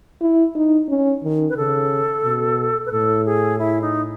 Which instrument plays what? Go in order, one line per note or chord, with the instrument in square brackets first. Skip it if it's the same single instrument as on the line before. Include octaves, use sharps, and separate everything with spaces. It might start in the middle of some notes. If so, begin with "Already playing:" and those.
[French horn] E4
D#4
C#4
D#3
[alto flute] B4
[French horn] C#3 [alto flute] A4
[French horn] B2
[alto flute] B4
[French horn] A2 [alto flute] A4
[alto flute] G#4
E4
D#4